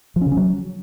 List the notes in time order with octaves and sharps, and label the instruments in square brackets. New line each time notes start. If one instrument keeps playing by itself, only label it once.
[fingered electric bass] F3
C#4
C#3
C#4
F#3